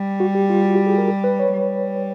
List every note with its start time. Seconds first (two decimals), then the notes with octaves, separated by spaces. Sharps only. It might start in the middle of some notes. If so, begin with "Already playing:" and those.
Already playing: G3
0.20 F#4
0.35 G4
0.50 F4
0.65 F#4
0.76 G4
0.86 G#4
0.98 A#4
1.24 B4
1.39 C#5
1.53 G3